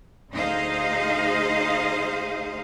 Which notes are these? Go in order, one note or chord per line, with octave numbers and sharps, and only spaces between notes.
D2 D#4 G#4 C5 D#5 F5